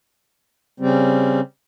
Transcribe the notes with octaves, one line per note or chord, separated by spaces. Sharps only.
C#3 G3 C4